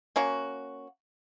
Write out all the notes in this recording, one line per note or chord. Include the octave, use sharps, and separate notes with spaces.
A#3 C#4 F#4